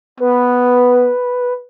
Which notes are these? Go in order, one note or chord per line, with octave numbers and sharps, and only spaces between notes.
B3 B4